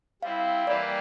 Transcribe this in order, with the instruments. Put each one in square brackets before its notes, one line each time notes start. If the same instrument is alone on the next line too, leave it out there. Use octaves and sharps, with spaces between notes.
[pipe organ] G3 C4 E4 [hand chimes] F5
[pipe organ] E3 G3 A#3 E4 G4 [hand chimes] D5